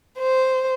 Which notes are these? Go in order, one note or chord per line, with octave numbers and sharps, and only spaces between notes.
C5